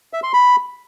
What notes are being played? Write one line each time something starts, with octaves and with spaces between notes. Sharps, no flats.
E5
C6
B5